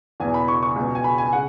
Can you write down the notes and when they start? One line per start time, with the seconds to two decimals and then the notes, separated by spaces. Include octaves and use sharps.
0.20 E2 B2 G#5
0.34 B5
0.48 C#6
0.63 C#6
0.76 C#2 B2
0.95 G#5
1.04 B5
1.18 G#5
1.33 C#3 F#5